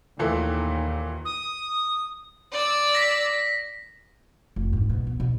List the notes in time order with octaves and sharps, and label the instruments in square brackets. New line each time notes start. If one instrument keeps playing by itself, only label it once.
[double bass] D#2 D#3 [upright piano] A#2 E3 A3
[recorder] D#6
[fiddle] D5 E6
[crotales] A#6 B6
[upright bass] F1
G#2
B2
B3
B2